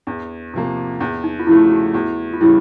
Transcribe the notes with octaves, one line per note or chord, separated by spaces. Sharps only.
E2 D4
C3 F3 A#3
E2 D4
D#4
F4
C#3 F3 A3 E4
G4
F#4
E2 F#4
F4
C#3 E3 G3 E4